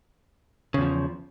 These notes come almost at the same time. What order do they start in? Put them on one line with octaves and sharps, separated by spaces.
C#3 E2 F3